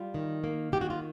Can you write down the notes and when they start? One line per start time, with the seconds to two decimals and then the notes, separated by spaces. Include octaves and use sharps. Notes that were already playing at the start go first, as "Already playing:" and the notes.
Already playing: G3 F4
0.14 D#3
0.44 A#3
0.72 D#3 G4
0.81 F#4
0.90 F4